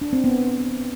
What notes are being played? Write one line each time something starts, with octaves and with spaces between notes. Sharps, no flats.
D4
C4
B3